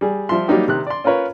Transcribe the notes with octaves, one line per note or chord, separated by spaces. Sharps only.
G3 G#4
F3 G3 E5 C6
F#3 G3 A#3 D#4 G4
C3 D#3 F#6
D5 C6
C#4 F4 A#4 B4 C#5